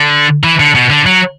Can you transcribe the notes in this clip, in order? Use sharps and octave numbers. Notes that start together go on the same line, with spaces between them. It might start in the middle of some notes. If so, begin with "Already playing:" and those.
Already playing: D3
E3
D3
B2
D3
F#3